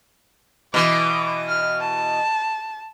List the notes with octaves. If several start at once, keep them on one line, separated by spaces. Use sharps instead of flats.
B2 E3 D6
F6
A5